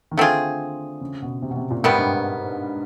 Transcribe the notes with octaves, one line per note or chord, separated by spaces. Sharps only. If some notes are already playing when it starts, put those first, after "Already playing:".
D#3
D3 A3 C4 F4 G#4
C#3
B2
C3
B2
C3
A#2
G#2 C3 D#3 G3 B3
G2